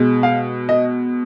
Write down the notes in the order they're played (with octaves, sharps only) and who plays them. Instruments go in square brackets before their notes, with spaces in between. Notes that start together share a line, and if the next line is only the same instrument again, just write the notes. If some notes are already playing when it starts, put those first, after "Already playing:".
Already playing: [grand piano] B2 G#3
F5
D#5